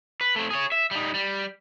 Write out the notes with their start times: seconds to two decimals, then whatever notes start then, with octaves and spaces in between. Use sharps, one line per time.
0.21 B4
0.36 A3 C4
0.51 G#4 C#5
0.72 E5
0.91 G3 D#4
1.14 G3